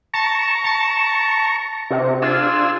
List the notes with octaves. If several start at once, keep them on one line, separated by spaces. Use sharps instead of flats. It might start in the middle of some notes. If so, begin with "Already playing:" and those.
A5 A#5 C#6
A5
C3
D4 F4 G#4 E6